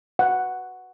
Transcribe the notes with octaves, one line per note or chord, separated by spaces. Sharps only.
F#5